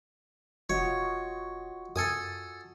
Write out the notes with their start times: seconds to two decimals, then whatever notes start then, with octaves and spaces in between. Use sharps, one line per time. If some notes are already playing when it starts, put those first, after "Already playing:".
0.70 E1 F4 F#4 C#5 D#5
1.96 F#2 A4 G#5 D#6